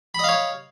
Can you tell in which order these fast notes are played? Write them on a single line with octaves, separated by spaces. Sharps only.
B5 D#5 F5 C#5